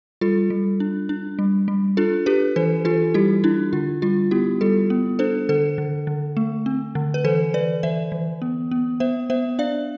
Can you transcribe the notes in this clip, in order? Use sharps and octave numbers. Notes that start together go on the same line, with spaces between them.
G3 F4 A4
G3
D4
D4
G3
G3
D4 F4 A4
D4 G4 B4
E3 A4 C5
E3 F4 A4
G3 E4 G4
D4 E4
D3 F4
G3 F4
B3 E4 G4
G3 F4 A4
B3
D4 A4 C5
D3 A4 C5
D3
D3
A3
C4
D3
B4
E3 A4 C5
E3 B4 D5
E3 C5 E5
E3
B3
B3
B3 C5 E5
B3 C5 E5
D4 D5 F5